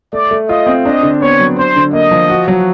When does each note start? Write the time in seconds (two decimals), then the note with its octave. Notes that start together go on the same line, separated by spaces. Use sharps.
0.13 A3 D5
0.31 A3
0.48 F4 D#5
0.67 C4
0.85 D4 D#5
1.03 D3
1.21 B3 C#5
1.39 F#3
1.57 D4 C5
1.76 D3
1.93 A#3 D#5
2.11 F3
2.30 F#4
2.48 F#3